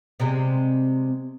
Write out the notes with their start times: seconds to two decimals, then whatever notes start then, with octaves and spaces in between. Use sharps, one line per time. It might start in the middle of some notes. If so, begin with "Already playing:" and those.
0.20 C3 G3 G#3